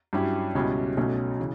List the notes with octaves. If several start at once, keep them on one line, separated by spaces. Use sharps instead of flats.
G2 F#3 C#4 E4 G4
C#2 B2 G3 C#4 E4
B1 B2 A3 C#4
C#3 E3